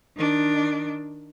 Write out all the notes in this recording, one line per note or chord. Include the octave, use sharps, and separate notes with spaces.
D#3 D4